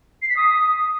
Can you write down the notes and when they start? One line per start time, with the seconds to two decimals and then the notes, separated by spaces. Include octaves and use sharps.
0.22 C7
0.29 B6
0.37 D#6